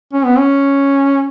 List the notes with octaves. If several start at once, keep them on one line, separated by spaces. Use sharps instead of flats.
C#4
B3
C#4